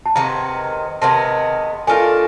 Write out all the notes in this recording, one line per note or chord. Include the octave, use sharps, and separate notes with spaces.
A5
C3 D#3 G#3 B3 A#5
C3 D#3 G#3 B3 A5
A3 D4 F4 A#4 G#5